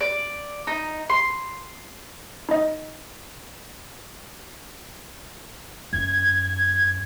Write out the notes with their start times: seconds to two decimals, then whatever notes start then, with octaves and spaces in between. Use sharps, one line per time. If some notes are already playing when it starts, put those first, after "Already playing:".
0.01 D5
0.67 D#4
1.09 C6
2.49 D#4 D#5
5.93 F#2 G#6